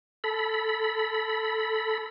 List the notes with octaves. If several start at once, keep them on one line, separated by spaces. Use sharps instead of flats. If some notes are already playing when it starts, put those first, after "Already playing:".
A4 B5